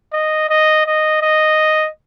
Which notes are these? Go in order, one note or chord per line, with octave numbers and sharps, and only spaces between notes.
D#5
D#5
D#5
D#5